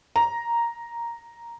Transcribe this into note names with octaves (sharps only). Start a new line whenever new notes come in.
A#5